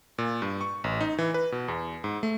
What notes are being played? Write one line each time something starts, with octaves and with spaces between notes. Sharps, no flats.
A#2
G2
C#6
A1
D#4
E3
B4
B2
E2
G#2
A3